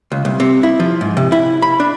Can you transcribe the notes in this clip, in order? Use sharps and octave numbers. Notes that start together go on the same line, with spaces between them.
C#2
C2
C3
E4
F3
G#2
C3
E4
B5
D4